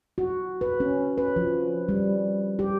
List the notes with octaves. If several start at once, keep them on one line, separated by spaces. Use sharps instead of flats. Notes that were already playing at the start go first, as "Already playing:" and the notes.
F#4
B4
C#4
B4
F3
G3
G4